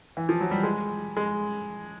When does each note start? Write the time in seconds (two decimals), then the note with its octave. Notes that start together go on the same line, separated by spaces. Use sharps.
0.17 E3
0.29 F3
0.41 F#3
0.51 G3
0.63 G#3
1.17 G#3